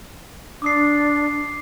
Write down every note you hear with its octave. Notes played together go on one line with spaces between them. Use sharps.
D4 D6 D#6 C7